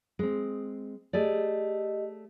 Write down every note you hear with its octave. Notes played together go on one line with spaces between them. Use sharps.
G#3 C4
A3 G4 G#4 D5 D#5